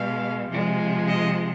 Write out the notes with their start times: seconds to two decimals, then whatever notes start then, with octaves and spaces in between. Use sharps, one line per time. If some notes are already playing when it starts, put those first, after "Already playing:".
Already playing: B2 G#3 F5
0.50 C3 F3 G#3
1.07 D#5